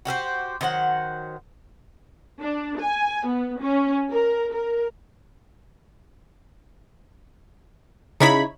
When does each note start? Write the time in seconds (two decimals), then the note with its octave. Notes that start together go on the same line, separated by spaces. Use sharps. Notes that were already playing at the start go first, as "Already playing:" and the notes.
0.05 F#4 G4 A#4 C5
0.61 D#3 F#3 C5 F#5
2.39 D4
2.79 G#5
3.26 B3
3.60 C#4
4.11 A#4
4.53 A#4
8.20 C#3 D#4 E4 C#5 B5